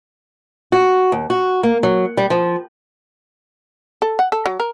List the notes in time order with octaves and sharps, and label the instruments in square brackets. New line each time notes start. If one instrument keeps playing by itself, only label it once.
[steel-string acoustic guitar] F#4
D#2
F#4
A#3
F#3
G3
F3
[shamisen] A4
F#5
A4
F#3
A#4